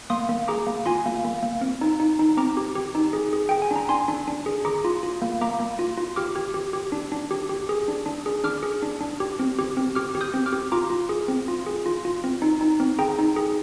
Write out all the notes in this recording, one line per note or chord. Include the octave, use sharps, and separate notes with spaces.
A#3 C6 D#6
A#3
G#4 A#5 D6
A#3
F4 G#5 C6
A#3
A#3
A#3
C4
D#4
D#4
D#4
C4 A#5 D6
G4
G4
D#4
G#4
G#4
G#4 G5
G#5
D4 A#5
D4 G#5 C6
D4
D4
G#4
G#4 A#5 D6
F4
F4
A#3
A#3 A#5 D6
A#3
F4
F4
G4 D6 F6
G4
G4
G4
D4
D4
G4
G4
G#4
D4
D4
G#4
D4 D6 F6
G#4
D4
D4
G4
C4
G4
C4
G4 D6 F6
G4
D#6 G6
C4
D6 F6
G4
F4 A#5 D6
F4
G#4
C4
F4
G#4
F4
F4
C4
D#4
D#4
C4
G#4 G5 A#5
D#4
G#4